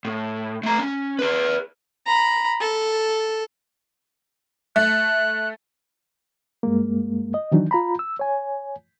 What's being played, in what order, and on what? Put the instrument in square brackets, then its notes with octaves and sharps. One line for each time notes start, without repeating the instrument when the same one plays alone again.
[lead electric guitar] A2
A3 A#5
C#4
G#4 B4
[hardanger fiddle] A#5 B5
A4
[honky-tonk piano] A3 [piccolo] F#6
[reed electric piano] G2 G#3 A#3
D#5
D#3 E3 F#3 D4 D#4
F4 A#5 B5
E6
C#5 G#5